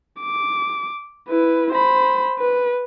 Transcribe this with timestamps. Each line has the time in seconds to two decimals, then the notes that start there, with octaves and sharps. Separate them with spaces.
0.21 D6
1.29 E4 B4
1.73 C5 B5
2.39 B4